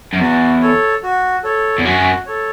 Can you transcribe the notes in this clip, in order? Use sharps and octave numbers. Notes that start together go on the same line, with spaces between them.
F#2
E2 F#4
A4 C#5
F#4
A4 C#5
E2
F#2 F#4
A4 C#5